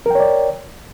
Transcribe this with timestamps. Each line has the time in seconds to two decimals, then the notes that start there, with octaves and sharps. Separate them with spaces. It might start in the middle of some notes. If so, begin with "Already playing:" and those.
0.06 A#4
0.11 G5
0.15 C#5
0.20 D5